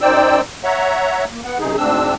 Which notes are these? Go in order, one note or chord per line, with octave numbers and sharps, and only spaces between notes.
F#2 D#4 C5 D5 G5 E6
C#5 E5 F#5 A#5
A#3
B3 F#5
F#2 C3 D#4 G#4
D2 G#2 C4 D4 E6